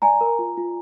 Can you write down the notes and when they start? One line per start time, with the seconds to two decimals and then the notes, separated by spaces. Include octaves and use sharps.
0.02 D5 G#5 A#5
0.21 A#4
0.39 F4
0.57 F4